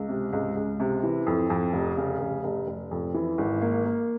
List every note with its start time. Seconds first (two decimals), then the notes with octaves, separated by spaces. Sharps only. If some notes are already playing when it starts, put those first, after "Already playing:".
Already playing: C#2
0.09 C3
0.33 C#2
0.56 C#2
0.80 C3
1.03 E3
1.27 F2
1.50 F2
1.74 F1
1.97 C#3
2.20 F1
2.44 F1
2.67 F1
2.91 F2
3.14 E3
3.38 G#1
3.62 A#3
3.85 A#3